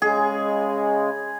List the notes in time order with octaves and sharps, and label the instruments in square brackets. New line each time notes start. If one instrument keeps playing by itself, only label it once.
[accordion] C#3 G#3 [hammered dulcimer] G#4